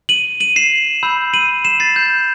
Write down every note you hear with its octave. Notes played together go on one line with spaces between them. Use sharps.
D#7 F#7
D#7 F#7
C7 E7
B5 E6 G6
D#7 F#7
C7 E7
A6 C7
G6